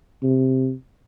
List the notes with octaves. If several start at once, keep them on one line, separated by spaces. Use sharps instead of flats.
C3